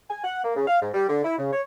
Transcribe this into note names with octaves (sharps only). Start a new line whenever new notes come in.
G#5
F#5
A#3
C#3
F5
G#2
G3
D3
E4
C#3
C#5